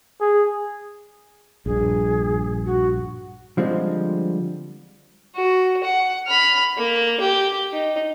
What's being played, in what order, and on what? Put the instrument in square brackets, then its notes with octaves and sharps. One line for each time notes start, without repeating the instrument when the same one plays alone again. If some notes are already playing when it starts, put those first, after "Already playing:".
[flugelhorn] G#4
[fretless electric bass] A#1 G2 [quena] G#4
[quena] F#4
[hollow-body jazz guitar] D3 F3 G3 G#3 C4 D4
[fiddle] F#4
F#5
B5 F6
A#3
G4
D#4